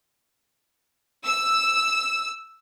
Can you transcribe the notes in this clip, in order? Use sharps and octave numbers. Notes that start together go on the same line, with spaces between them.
E6